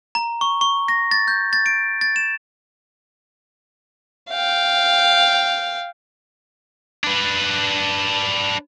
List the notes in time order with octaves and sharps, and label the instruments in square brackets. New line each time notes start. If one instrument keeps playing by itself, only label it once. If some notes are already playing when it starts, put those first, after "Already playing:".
[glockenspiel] A#5
C#6
C#6
A#6
A6
G6
A6
D7
A6
E7
[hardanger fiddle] F5 G5
[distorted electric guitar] D4 B4